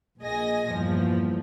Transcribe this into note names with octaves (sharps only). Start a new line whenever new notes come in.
A#1 A#2 G#4 D#5 G#5 A#6
E2 G2 A#2 F3